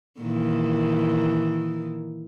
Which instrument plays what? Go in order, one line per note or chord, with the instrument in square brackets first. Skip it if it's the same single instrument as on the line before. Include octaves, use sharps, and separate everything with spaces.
[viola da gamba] A#2 D#3 E3